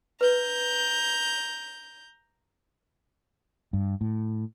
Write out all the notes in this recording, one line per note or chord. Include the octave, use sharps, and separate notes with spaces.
B4 A#5 G6
G2
A2